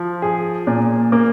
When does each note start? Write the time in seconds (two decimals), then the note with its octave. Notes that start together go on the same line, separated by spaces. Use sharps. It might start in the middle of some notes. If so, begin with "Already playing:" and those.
Already playing: F3
0.22 G#4
0.67 A#2
1.12 A#3